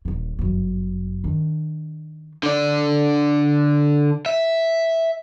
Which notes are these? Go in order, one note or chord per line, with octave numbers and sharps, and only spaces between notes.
D#1 D3
G1 F#2
D#3 D4
D3 D5
E5